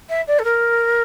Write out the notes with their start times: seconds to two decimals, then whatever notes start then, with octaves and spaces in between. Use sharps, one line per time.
0.09 E5
0.27 D5
0.39 A4
0.44 A#4